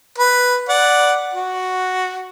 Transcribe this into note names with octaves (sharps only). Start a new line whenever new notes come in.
B4
D5 F#5
F#4